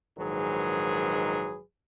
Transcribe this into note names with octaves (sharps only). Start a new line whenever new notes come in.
A#1 G#2 D#3 F#3 G#4 B4